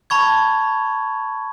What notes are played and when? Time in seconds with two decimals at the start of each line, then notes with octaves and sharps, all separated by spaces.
0.10 A5 B5 C#6 G#6